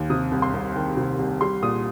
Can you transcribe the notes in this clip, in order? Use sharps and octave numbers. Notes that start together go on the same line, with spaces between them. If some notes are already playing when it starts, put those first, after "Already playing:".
Already playing: D#2
C3 D#6
C2
C6
C2
D#3 G5
C3
C2
G3 C6
A#2 D#6